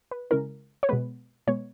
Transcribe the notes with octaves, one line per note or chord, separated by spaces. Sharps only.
B4
C#3 G#3 C#4 E4 A#4
C#5
B2 G#3 B3 B4
B2 G#3 B3 C#5